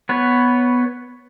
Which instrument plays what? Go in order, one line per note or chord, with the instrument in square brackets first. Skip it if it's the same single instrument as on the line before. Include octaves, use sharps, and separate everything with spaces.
[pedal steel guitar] B3 B4 C#5